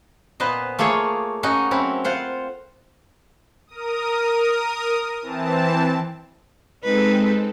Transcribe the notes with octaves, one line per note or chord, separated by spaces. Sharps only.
A#2 B3 B4 C5 D#5
A3 A#3 F4 G#4 C#5
C#4 D#4 F#4 D#5
F#3 C4 C#4 E4
F4 C5 F#5
A#4 D#6
E3 C4 A5
G#3 C4 D#4 A4 B4